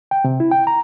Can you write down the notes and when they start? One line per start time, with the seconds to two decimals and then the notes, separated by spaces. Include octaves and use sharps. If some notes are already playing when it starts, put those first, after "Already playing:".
0.11 G5
0.24 C3
0.40 E4
0.51 G5
0.67 A#5